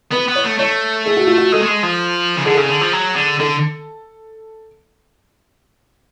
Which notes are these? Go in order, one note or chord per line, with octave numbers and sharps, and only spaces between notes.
B3 B4
B3
C#5
A3
A3 C#5
G#4
F#4
F4
F#4
G#3 A4
A3
G#3
F3
C#3
D3 G#4
A4
C#3
G#4
D3
F3
F#3
D3
D3 A4